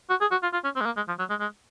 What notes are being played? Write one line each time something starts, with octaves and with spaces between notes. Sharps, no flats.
F#4
G#4
F#4
F4
F4
C#4
C4
G#3
A#3
G#3
F3
F#3
G#3
G#3